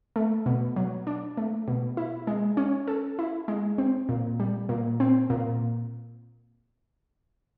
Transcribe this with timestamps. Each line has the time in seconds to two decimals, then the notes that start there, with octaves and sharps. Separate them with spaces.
0.16 A3
0.46 B2
0.76 F#3
1.07 D4
1.37 A3
1.68 B2
1.97 E4
2.27 G#3
2.57 C#4
2.88 A4
3.19 E4
3.48 G#3
3.78 C4
4.09 A#2
4.40 G3
4.69 A#2
5.00 C4
5.30 A#2